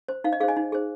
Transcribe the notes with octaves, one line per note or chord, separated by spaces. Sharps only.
C5
D#4 F5
D#5
G#4 C5 F5
D#5 G#5
D#4
G#4 C5